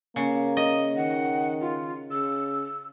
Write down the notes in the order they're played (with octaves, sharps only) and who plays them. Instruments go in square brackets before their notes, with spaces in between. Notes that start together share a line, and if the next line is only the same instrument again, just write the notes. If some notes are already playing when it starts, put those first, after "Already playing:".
[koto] C#3 [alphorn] A#3
[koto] D#5
[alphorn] D#3 [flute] F#5
[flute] F4
[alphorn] C#3 [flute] E6